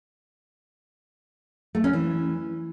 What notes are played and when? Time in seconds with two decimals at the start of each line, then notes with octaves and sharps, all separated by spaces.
1.75 A3
1.84 C#4
1.93 E3